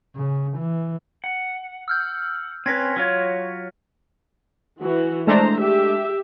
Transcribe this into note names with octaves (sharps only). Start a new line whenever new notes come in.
C#3
E3
F#5
E6 F6 G6
C4 C#4 B4 G#6 A#6 B6
F#3 F4 C#5
E3 F#4
G#3 A3 D4 C5 A#5
G4 E5